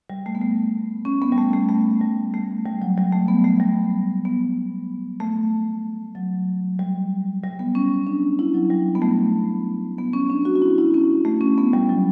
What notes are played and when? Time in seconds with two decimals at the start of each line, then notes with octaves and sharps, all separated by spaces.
0.10 G3
0.26 A3
0.35 B3
0.41 A3
1.05 C#4
1.22 B3
1.32 G3
1.38 A3
1.53 A3
1.69 A3
2.01 G3
2.34 A3
2.66 G3
2.82 F#3
2.98 G3
3.12 A3
3.28 B3
3.45 A3
3.60 G3
4.25 B3
5.20 A3
6.15 F#3
6.79 G3
7.44 G3
7.59 B3
7.75 C#4
8.07 D4
8.39 E4
8.54 F#3
8.70 G3
8.95 B3
9.02 A3
9.98 B3
10.13 C#4
10.30 D4
10.45 F#4
10.56 F#4
10.62 E4
10.78 E4
10.94 C#4
11.25 A3
11.41 C#4
11.58 B3
11.73 G3
11.89 F#3